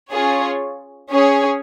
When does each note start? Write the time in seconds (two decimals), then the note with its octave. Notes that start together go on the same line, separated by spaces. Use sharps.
0.11 C#4 F4 G#4 C#5
1.10 C#4 G#4 C#5